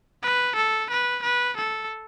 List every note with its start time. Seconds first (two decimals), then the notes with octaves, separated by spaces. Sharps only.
0.22 B4
0.56 A4
0.90 B4
1.23 B4
1.57 A4